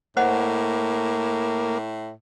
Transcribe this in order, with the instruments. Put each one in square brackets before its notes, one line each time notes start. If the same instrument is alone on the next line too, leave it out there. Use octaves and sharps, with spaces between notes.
[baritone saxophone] A2 [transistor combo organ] A#3 [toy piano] C5 D#5 F#5